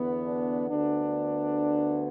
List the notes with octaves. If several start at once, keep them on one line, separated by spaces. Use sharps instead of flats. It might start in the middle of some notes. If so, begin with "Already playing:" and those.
Already playing: E2 D3 B3
D4
D2 D3 B3 D4